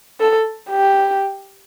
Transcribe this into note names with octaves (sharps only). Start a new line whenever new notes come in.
A4
G4